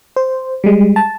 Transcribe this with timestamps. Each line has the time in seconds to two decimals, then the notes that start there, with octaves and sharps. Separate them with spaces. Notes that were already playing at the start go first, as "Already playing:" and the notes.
0.17 C5
0.64 G3 G#3
0.96 A5